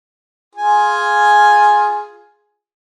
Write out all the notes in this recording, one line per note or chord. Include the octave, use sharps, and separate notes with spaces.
F4 G#4 G#5